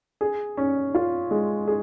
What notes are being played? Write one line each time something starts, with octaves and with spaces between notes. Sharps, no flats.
G#4
C#4
F4
G#3
G#4